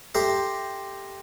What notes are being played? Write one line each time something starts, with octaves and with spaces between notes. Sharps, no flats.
G4 A4 E5 A#5 C6